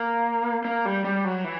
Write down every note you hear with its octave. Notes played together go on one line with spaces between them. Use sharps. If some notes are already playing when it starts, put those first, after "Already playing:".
Already playing: A#3
A#3
G3
G3
F#3
E3